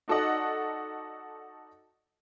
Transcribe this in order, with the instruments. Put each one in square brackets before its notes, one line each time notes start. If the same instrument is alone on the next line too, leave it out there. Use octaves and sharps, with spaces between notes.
[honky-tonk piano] D#4 F#4 A4 D5 D#5 F#5